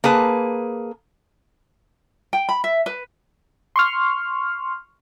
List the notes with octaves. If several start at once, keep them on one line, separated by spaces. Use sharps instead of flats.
A#3 G#4 B4 A5
G5
B5
E5
B4
C6 C#6 F6